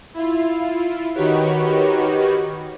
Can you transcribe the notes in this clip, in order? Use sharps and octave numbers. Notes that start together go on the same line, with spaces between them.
E4 F4
D#3 D#4 F#4 G4 B4 C#5